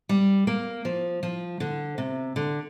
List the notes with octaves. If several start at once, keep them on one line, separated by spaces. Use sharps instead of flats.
G3
A#3
F3
F3
D3
C3
D3